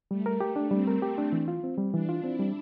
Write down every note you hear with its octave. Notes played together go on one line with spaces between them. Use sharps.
G3 A3
A#4
G4
D4
G3 C4
A#4
G4
D4
E3
F4
C4
G3
E3 D4
F4
C4 E4
G3